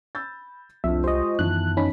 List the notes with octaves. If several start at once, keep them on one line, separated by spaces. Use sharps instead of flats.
B5 E6 G6 A6
C2 F2 D4 F4 E5
G#3 F4 G4 C5 D#5 C#6
F#2 D#3 E3 B3 F4 A5 F#6
C#4 D#4 B5